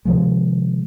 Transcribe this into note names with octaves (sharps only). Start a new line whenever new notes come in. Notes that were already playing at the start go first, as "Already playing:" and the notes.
C3 D#3 F3 G#3